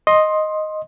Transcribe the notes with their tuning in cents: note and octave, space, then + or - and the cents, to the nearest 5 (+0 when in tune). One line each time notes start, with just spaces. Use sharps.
D#5 +0 C6 +15